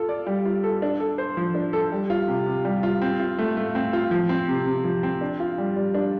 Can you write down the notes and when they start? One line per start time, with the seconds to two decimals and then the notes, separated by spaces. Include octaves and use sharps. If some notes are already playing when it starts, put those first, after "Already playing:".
Already playing: F4 A4
0.09 D5
0.26 G3
0.45 F4
0.64 A4
0.82 D4
1.00 A4
1.18 C5
1.37 F3
1.55 D4
1.73 A4
1.92 G3
2.10 F4
2.28 C3
2.46 C3
2.65 G3
2.83 F4
3.02 C4
3.20 F4
3.38 A3
3.57 A3
3.75 C4
3.93 F4
4.11 F3
4.29 C4
4.48 C3
4.66 C3
4.84 F3
5.03 C4
5.21 D4
5.40 F4
5.58 G3
5.76 G3
5.94 D4